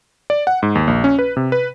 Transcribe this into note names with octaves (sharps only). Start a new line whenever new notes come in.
D5
F#5
G#2
D#2
A#1
C#4
B4
C3
B4